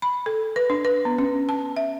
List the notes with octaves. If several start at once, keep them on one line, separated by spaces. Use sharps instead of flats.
B5
A4
B4
D4
B4
B3
C#4
A5
E5